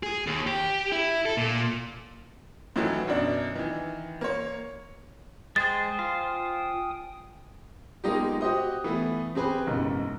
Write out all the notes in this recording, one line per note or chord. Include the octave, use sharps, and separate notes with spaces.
G#4
D#2
G4
E4
A4
A#2
A2 D#3 E3 F#3
F#2 B2 D4
D#3 E3
A#3 C#5
G#3 C5 G5 G#5 D#6 A6
F4 C5
G#3 A#3 B3 D#4 F4 G4
F#4 G4 C5 D#5 D#6
E3 A3 B3
C4 G4 G#4 B4
F#1 B1 G#2 C#3